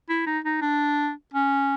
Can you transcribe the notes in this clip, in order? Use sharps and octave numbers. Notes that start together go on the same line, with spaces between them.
E4
D#4
D#4
D4
C#4